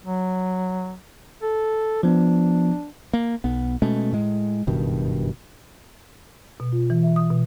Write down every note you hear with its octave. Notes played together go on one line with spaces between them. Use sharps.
F#3
A4
F3 B3 D4
A#3
B1 B3
B2 G#3 A3 C#4
A2 G#3
F#1 G2 B2 D#3
B2
F4
E3
E5
D#6
B2